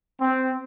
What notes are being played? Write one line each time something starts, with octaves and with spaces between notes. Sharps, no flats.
C4